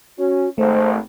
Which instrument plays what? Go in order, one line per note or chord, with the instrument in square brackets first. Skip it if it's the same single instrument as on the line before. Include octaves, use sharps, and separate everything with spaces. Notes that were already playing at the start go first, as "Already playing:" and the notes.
[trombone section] C#4 [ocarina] F#4
[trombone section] G#1 [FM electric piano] A3 [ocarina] C5